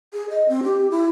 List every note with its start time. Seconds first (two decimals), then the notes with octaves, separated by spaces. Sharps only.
0.13 G#4
0.30 D#5
0.48 C4
0.63 G4
0.91 E4